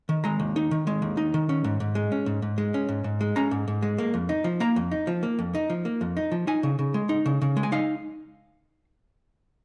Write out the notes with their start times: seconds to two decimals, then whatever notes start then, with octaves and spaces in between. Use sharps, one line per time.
0.09 D#3
0.24 G#3 A#5
0.40 D#2
0.56 D#4
0.71 D#3
0.87 G#3
1.02 D#2
1.17 D#4
1.34 D#3
1.49 C#4
1.64 G#2
1.80 G#2
1.95 G#3
2.12 C#4
2.26 G#2
2.42 G#2
2.58 G#3
2.74 C#4
2.89 G#2
3.04 G#2
3.21 G#3
3.36 C#4 A#5
3.51 G#2
3.68 G#2
3.82 G#3
3.98 A#3
4.14 F2
4.29 D#4
4.44 F3
4.60 A#3 A#5
4.76 F2
4.91 D#4
5.07 F3
5.23 A#3
5.39 F2
5.55 D#4
5.70 F3
5.85 A#3
6.01 F2
6.17 D#4
6.31 F3
6.47 D#4 G#5
6.63 C#3
6.79 C#3
6.94 G#3
7.09 D#4
7.26 C#3
7.42 C#3
7.57 G#3
7.63 G#5
7.72 D#4 F5